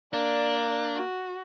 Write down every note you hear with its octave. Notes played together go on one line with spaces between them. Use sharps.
A#3 D4 D5
F#4